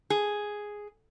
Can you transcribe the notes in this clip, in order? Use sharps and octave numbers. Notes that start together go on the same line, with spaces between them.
G#4